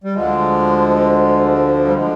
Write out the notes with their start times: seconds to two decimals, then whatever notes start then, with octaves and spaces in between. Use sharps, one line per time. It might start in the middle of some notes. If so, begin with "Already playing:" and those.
0.04 G3
0.14 D2 D3 F3 G#3
1.84 G3
1.94 D3 F3 G#3